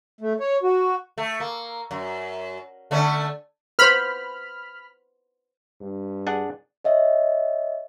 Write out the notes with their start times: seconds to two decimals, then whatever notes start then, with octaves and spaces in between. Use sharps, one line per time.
0.21 A3
0.40 C#5
0.63 F#4
1.18 A3
1.40 A#3
1.91 F#2
2.91 D3 A3 C#4
3.79 B4 C5 B5 F6
5.81 G2
6.27 D4 G#4 F#5
6.84 C#5 D#5 E5